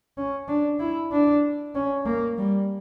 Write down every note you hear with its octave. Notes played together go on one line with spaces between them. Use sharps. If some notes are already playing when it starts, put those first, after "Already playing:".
C#4
D4
E4
D4
C#4
A#3
G3